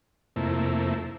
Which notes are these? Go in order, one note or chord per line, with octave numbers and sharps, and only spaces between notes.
F2 C3 A3 A#3 E4